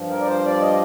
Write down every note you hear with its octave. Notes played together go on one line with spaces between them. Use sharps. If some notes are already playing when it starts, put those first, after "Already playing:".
Already playing: G2 F3
A#4
D5
C5
D5
D#5